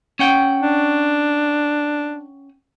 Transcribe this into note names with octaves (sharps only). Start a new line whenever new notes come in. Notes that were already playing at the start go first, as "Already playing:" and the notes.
C#4 F#5 G5
D4